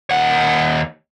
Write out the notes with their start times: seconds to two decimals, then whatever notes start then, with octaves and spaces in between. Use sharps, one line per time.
0.11 D#2 F#5